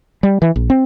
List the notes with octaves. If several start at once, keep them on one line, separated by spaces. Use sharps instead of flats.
G3
E3
A#1
C4